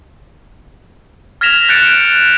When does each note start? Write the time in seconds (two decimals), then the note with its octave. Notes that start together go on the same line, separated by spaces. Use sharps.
1.41 F6 G#6 A#6 B6 E7 F7
1.69 F#6 G6 A6 C#7 D7